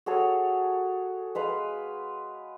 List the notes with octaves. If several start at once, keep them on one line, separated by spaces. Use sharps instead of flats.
F#4 G#4 A4 C#5
G#3 B4 F5